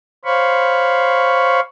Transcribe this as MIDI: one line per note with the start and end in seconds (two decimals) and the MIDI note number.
0.25 1.60 72
0.25 1.60 73
0.25 1.60 77
0.25 1.60 83
0.25 1.60 85